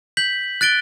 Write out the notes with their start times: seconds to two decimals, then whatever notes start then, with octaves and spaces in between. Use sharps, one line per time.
0.17 G6 B6 F#7
0.61 F#6 A6 D7 G7